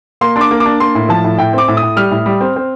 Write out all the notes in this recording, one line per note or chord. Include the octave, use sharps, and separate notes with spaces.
A#3 C6
D4 C6
D6
A#3
D6
D4
A#3 C6
A2
F3 A5
A2
A2 G5
C4 D6
A2
D#6
A2
G3 F6
A2
G3
C4
C4